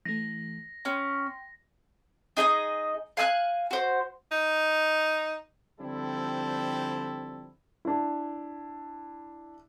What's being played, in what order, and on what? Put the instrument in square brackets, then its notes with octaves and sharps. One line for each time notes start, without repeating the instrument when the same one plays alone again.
[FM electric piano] E3 A3 [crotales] A#6
[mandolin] C#4 [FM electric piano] G5 C6
[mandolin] D#4 G#4 C5 D#5
F5 G#5 E6 F#6
F#4 C5
[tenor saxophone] D#4
[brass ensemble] D3 F3 G3 C4 E4 A4
[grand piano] D4 E4